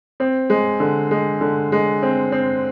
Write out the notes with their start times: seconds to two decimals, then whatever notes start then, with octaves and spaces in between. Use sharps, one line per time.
0.20 C4
0.50 G#3
0.80 D3
1.11 G#3
1.41 D3
1.72 G#3
2.02 C4
2.32 C4